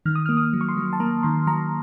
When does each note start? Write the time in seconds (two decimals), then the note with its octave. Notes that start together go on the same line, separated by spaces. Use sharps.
0.05 D#3 F6
0.15 D#6
0.26 A#3 F6
0.37 D#6
0.53 F#3
0.61 C#6
0.69 C6
0.77 F#3
0.93 A5
1.00 A#3 A#5
1.23 D#3 C6
1.47 F#3 A#5